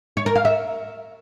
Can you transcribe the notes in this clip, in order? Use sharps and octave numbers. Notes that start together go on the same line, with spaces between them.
C#5
A#4
F5
E5